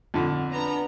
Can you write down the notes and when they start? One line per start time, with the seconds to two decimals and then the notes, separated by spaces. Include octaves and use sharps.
0.14 F2 D3
0.50 B3 D4 A#5